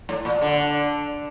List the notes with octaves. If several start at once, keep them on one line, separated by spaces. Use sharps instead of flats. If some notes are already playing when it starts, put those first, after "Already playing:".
A2
A#2
D3